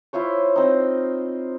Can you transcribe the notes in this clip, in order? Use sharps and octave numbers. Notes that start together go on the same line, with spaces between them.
E4 F4 C5 C#5
C4 D#4